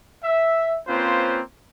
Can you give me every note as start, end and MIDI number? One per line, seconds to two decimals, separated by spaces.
0.24 0.78 76
0.88 1.41 58
0.88 1.41 60
0.88 1.41 61
0.88 1.41 65
0.88 1.41 71
0.88 1.41 72